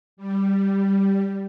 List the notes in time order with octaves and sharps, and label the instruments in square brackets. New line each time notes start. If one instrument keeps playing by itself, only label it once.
[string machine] G3